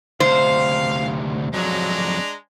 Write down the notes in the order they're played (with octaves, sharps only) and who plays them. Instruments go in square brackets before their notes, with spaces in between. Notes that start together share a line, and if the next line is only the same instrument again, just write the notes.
[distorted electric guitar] D2 C3 [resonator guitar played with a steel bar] C5 [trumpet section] F5
[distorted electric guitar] F2 F#3 [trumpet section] G#3 D4 A#5